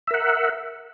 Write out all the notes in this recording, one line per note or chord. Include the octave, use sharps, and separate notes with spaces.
A#4 E5 F#5